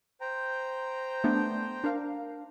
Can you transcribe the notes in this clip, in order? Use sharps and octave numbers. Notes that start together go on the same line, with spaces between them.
C5 G5 A#5
A3 B3 D4
D4 A#4 F5